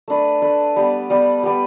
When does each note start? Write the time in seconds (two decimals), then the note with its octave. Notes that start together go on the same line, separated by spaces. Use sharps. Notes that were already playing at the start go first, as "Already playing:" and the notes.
0.08 A3 D4 B4
0.42 A3 D4 B4
0.76 G3 B3 G4 D5
1.10 G3 B3 G4 D5
1.43 G3 B3 G4 B4